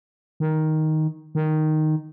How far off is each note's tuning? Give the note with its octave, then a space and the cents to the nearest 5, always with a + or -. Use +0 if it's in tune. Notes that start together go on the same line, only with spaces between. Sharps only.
D#3 +5
D#3 -5